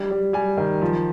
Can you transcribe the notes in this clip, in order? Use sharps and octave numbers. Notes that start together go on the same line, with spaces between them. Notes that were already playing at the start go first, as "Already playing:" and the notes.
Already playing: G3
G3
G3 G#5
D#3
F3